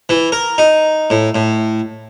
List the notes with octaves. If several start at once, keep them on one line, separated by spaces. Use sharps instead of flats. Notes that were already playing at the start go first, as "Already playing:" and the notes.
E3
A#4
D#4
A2
A2